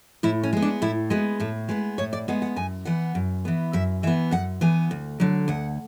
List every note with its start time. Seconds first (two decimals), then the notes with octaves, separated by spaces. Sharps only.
0.23 A2 E4
0.43 C#4
0.53 G#3 B3
0.62 D4
0.82 A2 E4
1.10 G#3 B3 F#4
1.40 A2 A4
1.69 G#3 B3 B4
1.98 A2 C#5
2.13 D5
2.28 G#3 B3 F#5
2.42 F#5
2.56 F#2 G#5
2.85 E3 B3 F#5
3.15 F#2
3.45 E3 B3
3.73 F#2 E5
4.03 E3 E5
4.07 B3
4.31 F#2 F#5
4.61 E3 B3 G#5
4.91 D2
5.20 D3 F#3
5.48 D2 F#5